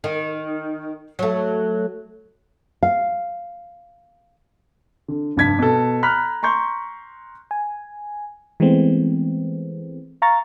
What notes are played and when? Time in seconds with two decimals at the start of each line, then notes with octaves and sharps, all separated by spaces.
0.04 D#3
1.19 F#3 A3
2.83 F5
5.08 D3
5.36 F1 G2 A5 G#6 B6
5.59 B2 A4
6.03 A#5 B5 F6 F#6 B6
6.43 A#5 C6 C#6 G6
7.51 G#5
8.60 E3 G#3 A3 B3 C4
10.22 F5 A#5 C#6 A6